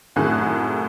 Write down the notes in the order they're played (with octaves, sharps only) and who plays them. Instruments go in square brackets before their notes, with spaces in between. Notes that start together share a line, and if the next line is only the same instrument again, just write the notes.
[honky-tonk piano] C2 F#2 A2 D#3 G#4 F#6